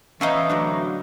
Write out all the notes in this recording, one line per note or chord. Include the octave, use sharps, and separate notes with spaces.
E3 A3 B3 C#4 D#4 F5
D2 F#3 D4